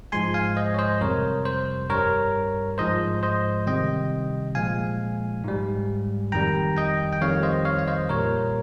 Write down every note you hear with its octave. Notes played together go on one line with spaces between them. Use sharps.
G#2 F3 G#3 G#5 C6
F5 G#5
C5 D#5
C#5
C5 D#5
F2 C3 G3 A#4 C#5
C5
G2 G3 A#4 C#5
G#2 F3 G#3 C5 D#5
C5 D#5
C3 D#3 G3 D#5 G5
A#2 F3 G#3 F5 G#5
G#2 G3
F2 D#3 G3 G5 A#5
D#5 G5
G5
F2 D#3 G3 C#5 F5
C5 D#5
C#5 F5
F5
C5 D#5
A#2 G3 A#4 C#5